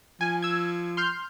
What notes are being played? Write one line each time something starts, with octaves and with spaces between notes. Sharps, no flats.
F3 G#5
E6 G#6
C6 F6 G6